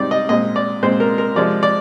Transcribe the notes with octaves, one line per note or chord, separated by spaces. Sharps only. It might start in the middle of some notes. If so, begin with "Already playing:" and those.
Already playing: G#2 G3 C4 D#4 D5
D#5
A#2 G#3 C4 D#5
D5
A#2 G#3 C4 C5
A#4
A#4
C3 F3 G#3 D5
D5